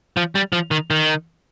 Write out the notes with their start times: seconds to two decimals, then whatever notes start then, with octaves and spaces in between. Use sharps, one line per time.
0.17 F3
0.35 G3
0.53 F3
0.71 D#3
0.91 D#3